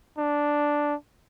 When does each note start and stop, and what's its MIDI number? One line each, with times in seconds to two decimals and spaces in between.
0.18 0.95 62